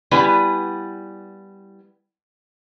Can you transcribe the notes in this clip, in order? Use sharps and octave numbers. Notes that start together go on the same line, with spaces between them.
G3 B3 E4 B4 D5 G#5